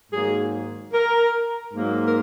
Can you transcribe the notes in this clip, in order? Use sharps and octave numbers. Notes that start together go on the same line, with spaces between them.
G#2 D#3 F#3 A#3 G#4
A#4
G#2 F#3 A#3
A#4